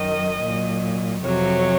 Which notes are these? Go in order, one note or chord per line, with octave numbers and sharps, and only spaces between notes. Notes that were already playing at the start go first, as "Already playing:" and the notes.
Already playing: F#2 D#3 F#3 D#5
A#2 F#3
F2 C3 F#3 C#5